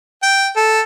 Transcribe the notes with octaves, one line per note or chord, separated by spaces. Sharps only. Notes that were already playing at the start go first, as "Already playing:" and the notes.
G5
A4